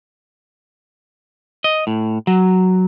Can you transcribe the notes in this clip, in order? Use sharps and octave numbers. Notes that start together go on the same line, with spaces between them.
D#5
A2
F#3